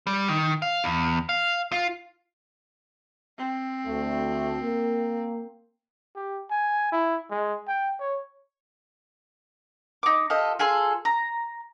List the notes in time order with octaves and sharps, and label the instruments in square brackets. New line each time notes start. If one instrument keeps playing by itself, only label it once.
[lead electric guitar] G3
D#3
F5
E2
F5
F4
[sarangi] C4
[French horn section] D2 A3
A#3
[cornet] G4
G#5
E4
G#3
G5
C#5
[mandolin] D#4 D6
F4 G4 A4 D#5
F4 G#4 A4 C6
A#5